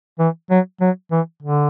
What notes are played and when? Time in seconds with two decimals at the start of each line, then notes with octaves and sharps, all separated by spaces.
0.19 E3
0.50 F#3
0.81 F#3
1.11 E3
1.43 D3